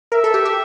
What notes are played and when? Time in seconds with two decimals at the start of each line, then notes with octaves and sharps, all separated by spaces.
0.12 A#4 E5
0.24 A4
0.34 G4
0.45 G4